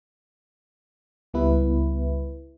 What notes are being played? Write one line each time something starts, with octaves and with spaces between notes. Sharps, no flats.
C#2 G3 B3 E4 B4